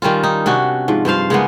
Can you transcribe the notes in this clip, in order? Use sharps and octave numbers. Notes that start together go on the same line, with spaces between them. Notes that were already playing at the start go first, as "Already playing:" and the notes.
D#3 G3 C#4 F4
D#4
C3 C#4 D4 F#4
G#2 F3
G2 F3 C5 F5
C#3 G#3 A#3 B3